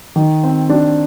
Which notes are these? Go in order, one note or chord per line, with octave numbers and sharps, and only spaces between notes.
D#3
C4
D4